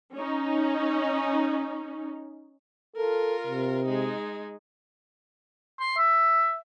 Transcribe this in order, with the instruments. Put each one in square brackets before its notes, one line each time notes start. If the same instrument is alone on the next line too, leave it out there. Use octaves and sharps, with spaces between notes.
[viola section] C#4 D#4
[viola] F4 A#4 [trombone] A4
[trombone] C3
[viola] G#3 D#4
[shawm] C6
E5